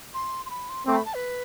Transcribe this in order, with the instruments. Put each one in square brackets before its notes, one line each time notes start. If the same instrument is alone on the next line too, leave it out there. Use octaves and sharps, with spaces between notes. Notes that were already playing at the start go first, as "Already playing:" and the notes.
[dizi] C6
C6
B5
C6
[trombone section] A3 C4 [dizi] D6
[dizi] A5
B5
A5
B4